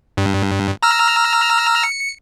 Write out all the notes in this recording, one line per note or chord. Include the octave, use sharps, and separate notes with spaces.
G2
A#5 E6 F6
C#7